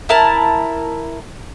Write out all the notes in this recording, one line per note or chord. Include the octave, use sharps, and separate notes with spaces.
E4 A#4 A5